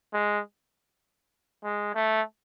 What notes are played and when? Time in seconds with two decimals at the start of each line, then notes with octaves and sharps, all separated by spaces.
0.13 G#3
1.64 G#3
1.94 A3